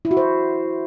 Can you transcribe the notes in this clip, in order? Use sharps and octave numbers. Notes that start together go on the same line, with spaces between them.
E4
F#4
C5